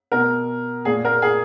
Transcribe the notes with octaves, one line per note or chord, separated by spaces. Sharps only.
B2 A#4
A#2 G#4
A#4
G#4